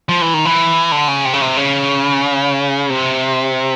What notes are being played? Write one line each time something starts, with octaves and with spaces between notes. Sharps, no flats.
F3
E3
D#3
E3
D3
C#3
C3
C#3
C3
C#3
C3